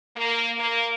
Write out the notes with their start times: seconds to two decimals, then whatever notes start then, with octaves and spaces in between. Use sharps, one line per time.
0.16 A#3
0.58 A#3